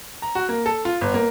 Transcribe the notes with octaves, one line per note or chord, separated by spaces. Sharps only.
A#5
F#4
A#3
A4
F4
G1
A#3